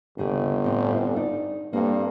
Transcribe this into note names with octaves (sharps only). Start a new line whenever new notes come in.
G1 D#2 C#3 G4
A2 C4
D#4 D5
G2 A#3 C4 A4